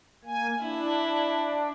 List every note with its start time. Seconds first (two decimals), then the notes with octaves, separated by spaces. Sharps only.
0.25 A#3 G#5
0.61 D4 E4